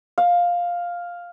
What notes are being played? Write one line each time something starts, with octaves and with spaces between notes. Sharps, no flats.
F5